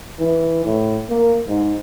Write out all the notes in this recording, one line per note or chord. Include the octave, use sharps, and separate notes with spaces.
E3
A2
A#3
G#2